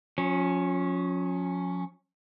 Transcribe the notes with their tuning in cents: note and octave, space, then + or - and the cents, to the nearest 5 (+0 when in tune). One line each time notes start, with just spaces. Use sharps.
F3 +45 C#4 +0